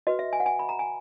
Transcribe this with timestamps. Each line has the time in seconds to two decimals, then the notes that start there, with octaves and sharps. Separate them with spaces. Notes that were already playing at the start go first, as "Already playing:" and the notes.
0.07 F#4 B4 D#5
0.19 E5
0.33 G#5
0.40 F#5
0.46 G#5
0.59 B5
0.69 A#5
0.79 G#5